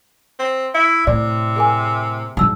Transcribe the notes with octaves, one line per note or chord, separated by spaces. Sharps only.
C4
E4 E5
A2 C3 D5
G#4 A#4 G#5
G#2 F#3 D#4 E6